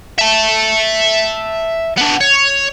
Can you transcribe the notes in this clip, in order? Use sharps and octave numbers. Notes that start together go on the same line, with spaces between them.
E5 A5
B3 D4
C#5